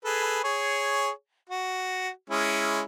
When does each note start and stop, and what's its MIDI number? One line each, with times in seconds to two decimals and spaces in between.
0.05 0.41 68
0.05 0.41 69
0.05 0.41 71
0.44 1.10 68
0.44 1.10 73
1.49 2.09 66
2.30 2.82 56
2.30 2.82 61
2.30 2.82 64